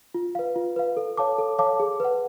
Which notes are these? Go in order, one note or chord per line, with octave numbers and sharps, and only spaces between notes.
F4
B4 F5
F4
B4 F5
A4
C#5 F5 A5 D6
A4
C#5 F5 A5 D6
G#4
B4 F#5